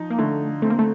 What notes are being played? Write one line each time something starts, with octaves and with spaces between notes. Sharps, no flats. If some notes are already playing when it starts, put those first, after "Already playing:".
Already playing: F3 D#4
A#3
D3 A3
A3 C4
A#3
A3